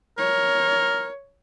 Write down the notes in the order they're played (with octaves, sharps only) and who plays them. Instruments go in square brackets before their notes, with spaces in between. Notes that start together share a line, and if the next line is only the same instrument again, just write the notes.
[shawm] A#4 [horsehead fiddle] C#5